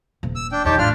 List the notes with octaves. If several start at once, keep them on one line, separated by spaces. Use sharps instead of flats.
D#1
E6
D4 G5
E2 D#4 G4 C#5 G5 A5
A1 D4 F4 F6